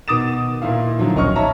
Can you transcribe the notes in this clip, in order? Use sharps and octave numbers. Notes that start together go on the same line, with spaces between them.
B2 D#3 D6 D#6 A6 E7
A#2 D#3 E4 F5
G#2 D3 D#3 F3 F#3
D#1 B1 C#4 D#5 C#6 F6
C#5 E5 A5 A#5